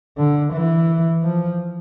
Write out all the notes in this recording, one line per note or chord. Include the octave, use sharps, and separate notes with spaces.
D3
E3
F3